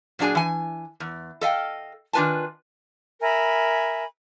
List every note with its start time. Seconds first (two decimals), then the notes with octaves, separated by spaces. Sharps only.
0.19 A#2 F#3 D4 G#4 G#5
0.35 E3 G#5
1.00 E2
1.41 A4 D#5 F5 G5
2.13 D#3 D4 F4 B4 G#5 A5
3.21 A#4 E5 G#5 B5